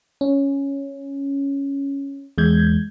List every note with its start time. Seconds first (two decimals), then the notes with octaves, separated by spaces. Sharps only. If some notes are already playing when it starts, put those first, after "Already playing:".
0.21 C#4
2.38 E2 G#3 G6 G#6